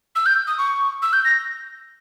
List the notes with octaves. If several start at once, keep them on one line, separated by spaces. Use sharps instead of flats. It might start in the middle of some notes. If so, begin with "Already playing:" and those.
E6
G6
D#6
C#6
E6
G6
A#6